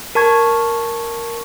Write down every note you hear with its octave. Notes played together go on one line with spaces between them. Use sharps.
A#4 A5 C#6 G#6